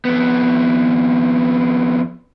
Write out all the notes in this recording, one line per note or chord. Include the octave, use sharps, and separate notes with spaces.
F2 B3